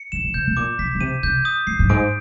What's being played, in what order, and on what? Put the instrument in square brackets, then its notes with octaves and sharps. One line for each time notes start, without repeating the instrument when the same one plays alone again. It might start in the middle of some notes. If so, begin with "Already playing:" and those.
Already playing: [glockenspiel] C#7
[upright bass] D3 [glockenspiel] E7
[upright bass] B2
[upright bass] C3 [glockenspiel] G6
[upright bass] B2
[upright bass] A#2 [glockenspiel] D6
[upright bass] B2 [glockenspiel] B6
[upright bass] C#3
[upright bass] C3 [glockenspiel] D#7
[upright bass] C3 [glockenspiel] G6
[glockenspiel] D#6
[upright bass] G#2 [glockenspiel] C7
[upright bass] G2
[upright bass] G#2 [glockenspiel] D7